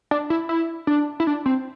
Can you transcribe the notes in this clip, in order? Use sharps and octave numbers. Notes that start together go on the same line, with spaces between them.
D4
E4
E4
D4
E4
D4
C4